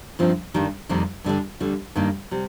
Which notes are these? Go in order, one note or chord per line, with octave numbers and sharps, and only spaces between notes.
G2 F3 C4 D#4
G2 D#3 G3 D4
F2 C3 D#3 G3 A#3
G2 D3 G3 D4
D2 D3 G3
G2 D#3 A#3 D#4
C3 G3